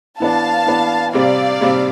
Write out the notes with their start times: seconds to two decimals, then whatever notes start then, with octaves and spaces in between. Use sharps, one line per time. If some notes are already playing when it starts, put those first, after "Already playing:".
0.20 E3 B3 D4 F5 A5
0.66 E3 B3 D4
1.13 C3 G3 C4 D5 F5
1.61 C3 G3 C4